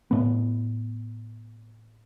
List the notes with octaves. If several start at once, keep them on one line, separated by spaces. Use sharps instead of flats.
A2 B3